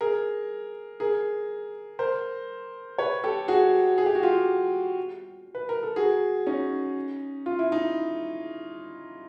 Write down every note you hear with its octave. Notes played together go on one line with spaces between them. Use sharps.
G#4 A#4
G#4 A#4
A#4 C5
B4 C#5
G4 A4
F#4 G#4
G#4
G4
F#4
F4 G4
B4
A#4
A4
F#4 G#4
C#4 D#4
F4
E4
D#4